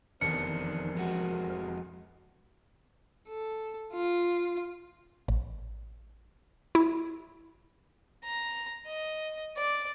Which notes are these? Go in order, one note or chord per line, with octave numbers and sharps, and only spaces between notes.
F1 E2 D#3 F3 D4 A#4 C#7
F2 G#3 F#4
A4
F4
A1
E4
A#5
D#5
D5